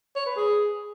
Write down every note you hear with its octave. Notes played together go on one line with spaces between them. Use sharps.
C#5
B4
G#4